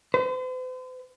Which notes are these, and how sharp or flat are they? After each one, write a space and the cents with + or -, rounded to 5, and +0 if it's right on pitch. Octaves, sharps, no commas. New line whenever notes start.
C5 -45